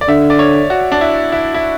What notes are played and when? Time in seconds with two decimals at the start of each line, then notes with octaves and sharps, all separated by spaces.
0.01 D5
0.08 D3 E5
0.30 D5
0.39 C#5
0.70 F#4
0.92 D4
1.01 E4
1.32 E4
1.54 E4